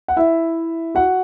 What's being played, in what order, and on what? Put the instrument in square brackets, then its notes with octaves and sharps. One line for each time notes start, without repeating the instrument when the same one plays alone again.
[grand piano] F#5
E4 E5
F#4 F#5